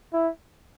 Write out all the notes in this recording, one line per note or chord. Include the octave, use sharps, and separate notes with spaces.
E4